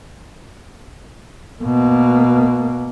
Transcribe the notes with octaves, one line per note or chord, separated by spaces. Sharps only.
B2 A#3